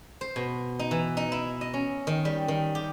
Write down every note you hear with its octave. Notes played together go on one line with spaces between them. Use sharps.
C5
B2
D#4
E3
D#4
E4
D#5
C#4
D#3
G3
D#3
G4